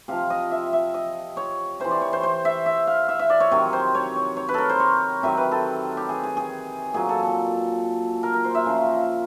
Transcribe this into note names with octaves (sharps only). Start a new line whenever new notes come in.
C3 F3 F5
D#5
E5
E5
D#5
C#5
C3 E3 C5
D5
C#5
C5
C5
E5
E5
F5
E5
E5
D5
C#5
C3 D#3 F#3 C#5
C5
C#5
C#5
C#5
B4
A4 A#4
C5
C#5
C3 D#3 F#3 E5
B4
A4
G4
G#4
G#4
G#4
A#2 F#3 G#4
A4
A4
A#4
A#4
C5
E5
C#3 F3